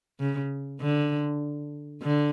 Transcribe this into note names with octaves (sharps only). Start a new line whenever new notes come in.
C#3
D3
D3